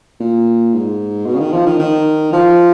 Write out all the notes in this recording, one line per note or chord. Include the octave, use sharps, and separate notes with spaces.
A#2
G#2
B2
C#3
D#3
F3
D#3
D#3
F3